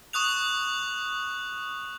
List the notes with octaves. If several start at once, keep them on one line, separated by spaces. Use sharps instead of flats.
C#6 D#6 F#6 F7